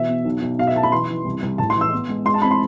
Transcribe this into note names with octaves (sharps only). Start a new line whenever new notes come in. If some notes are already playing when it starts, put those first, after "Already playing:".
Already playing: B2 E3 E5
B3
B1
B1
B2 F5
E5
B1 A5
B5
E3 C6
E3
C2
C2
A2 A5
C6
E3 E6
B3
G#3
G#3 C6
A5
C4 B5
C6